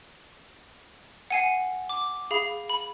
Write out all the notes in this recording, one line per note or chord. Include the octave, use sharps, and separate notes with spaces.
F#5 G#5 C7
D6
G#4 F5 B5
B5